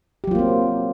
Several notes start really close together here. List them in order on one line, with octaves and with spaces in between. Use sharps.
G4 F#3 F4 A#3 C4